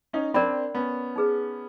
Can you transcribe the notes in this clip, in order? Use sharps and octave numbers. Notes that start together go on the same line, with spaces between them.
C#4 D#4
C4 D4 A#4 D5 G5 B5
B3 C#4
D#4 G#4 B4